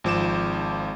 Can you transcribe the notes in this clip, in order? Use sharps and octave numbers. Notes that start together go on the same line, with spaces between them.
G#1 F3 D6 E7